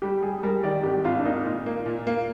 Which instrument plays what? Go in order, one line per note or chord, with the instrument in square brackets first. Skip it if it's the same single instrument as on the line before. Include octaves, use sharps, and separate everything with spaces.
[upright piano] G3 [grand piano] G4
[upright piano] G3 [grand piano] G#4
[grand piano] G#4
[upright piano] G3 [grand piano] A#4
[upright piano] D#3 [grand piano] D5
[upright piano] G#1 [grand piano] G4
[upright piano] G#1 [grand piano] F4
[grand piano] D4
[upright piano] A#3 [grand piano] D#4
[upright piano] A#2
A#3
A#2
A#3